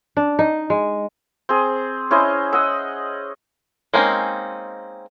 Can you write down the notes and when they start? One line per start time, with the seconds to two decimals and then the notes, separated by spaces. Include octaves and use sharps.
0.17 D4
0.39 D#4
0.70 G#3
1.49 C4 G#4
2.11 C#4 E4 C5 D#5
2.53 D#5 F#5 E6
3.94 G#3 A#3 C4 C#4 D#4